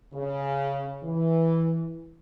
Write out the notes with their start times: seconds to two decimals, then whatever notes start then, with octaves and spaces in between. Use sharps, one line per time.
0.14 C#3
1.03 E3